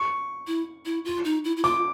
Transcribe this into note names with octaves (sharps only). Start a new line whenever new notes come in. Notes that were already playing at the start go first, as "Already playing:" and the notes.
Already playing: C#6
E4
E4
F4
D#4
E4
E4
F4 D6